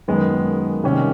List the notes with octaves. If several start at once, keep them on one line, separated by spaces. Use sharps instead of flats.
F#2 D#3 G#3 B3
C3 D#3 G3 A#3 C#4